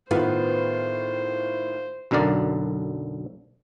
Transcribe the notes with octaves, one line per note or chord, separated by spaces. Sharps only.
A2 D#3 B3 F4 C5
B1 F#2 D3 A#4 D5